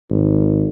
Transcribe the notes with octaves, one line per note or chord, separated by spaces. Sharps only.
G#1